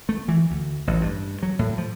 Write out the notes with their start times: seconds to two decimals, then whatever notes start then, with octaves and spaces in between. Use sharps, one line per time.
0.09 A3
0.28 E3
0.51 D2
0.87 A1
1.01 G2
1.43 F#3
1.59 A2
1.78 F3